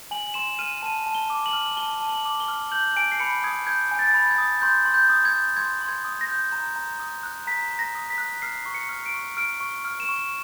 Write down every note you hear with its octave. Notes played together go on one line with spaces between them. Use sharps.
G#5 F#7
C6 E7
F6 D#7
A5 D#7
A5
G7
D6
F#7
F6
A5 G7
A5
F#7
D6
G7
F6
G6 F#7
G#5 D7
C7
B5 C#7
D#6 G#6
G6 G#6
G#5
A6
B5
G#6
D#6
C6 G6
C6
G6
D#6
G#6
G6
C6 G#6
C6
G#6
D#6
A#6
G6
A#5
A#5
D#6
F#6
A#5 B6
A#5
A#6
D#6
B6
F#6
F6 C7
C#6
C#7
F6
D7
C#6
F6 D7
C#6
F6
E7
C#6